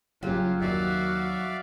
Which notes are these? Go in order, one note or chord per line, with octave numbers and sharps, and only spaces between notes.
F#1 A2 C#3 F#3 F4 G4
D#2 D#3 F#4 D5 E5 F5